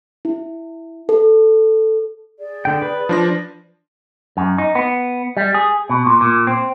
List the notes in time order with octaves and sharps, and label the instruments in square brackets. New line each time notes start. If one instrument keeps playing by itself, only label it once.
[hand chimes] E4
A4
[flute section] G#4 D5
[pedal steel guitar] D3 G5
B4
[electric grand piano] F3 D4 A#6
[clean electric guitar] F#2
D#4
B3
G3
G#4
B2
A#2
A#2
C4